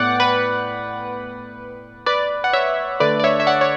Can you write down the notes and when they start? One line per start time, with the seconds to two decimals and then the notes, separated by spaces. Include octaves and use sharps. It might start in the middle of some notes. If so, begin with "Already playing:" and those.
Already playing: A2 B3 D5 F#5 G5
0.20 B4
2.06 B4 D5
2.44 F#5
2.53 C#5 E5
3.00 D3 A3 D4 B4 D5
3.20 D5
3.24 C#5 E5
3.40 E5
3.47 D5 F#5
3.61 C#5